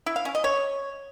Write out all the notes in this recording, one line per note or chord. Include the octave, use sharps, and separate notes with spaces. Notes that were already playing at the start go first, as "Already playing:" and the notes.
E4
F5
C#4
D#5
C#5